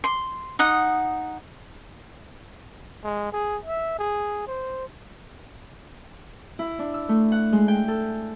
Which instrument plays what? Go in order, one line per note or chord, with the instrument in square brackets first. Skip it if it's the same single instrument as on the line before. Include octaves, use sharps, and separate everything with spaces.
[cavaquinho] C6
D#4 F#5 D#6
[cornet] G#3
G#4
E5
G#4
C5
[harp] E4
D4
E6
A3
F#5
G#3
G5
A4